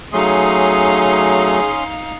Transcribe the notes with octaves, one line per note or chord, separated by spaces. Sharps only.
F#3 A3 C#4 D#4 G#4 F5 C6 D#6